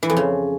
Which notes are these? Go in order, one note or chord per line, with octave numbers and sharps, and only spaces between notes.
E3
F2
C#3